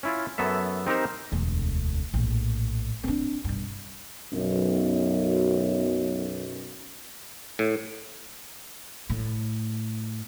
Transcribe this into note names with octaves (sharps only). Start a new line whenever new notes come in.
C#4 E4 F4
F#2 F#3 B3 A4 E5
C4 D#4 G4 A#4 C5
E1 D2
A#1 A2
C4 D4
B1 G2
B1 F#2
A2
A2